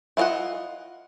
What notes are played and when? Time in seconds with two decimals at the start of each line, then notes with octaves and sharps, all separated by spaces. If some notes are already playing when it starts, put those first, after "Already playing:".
0.17 E4 F4 D5 D#5 F#5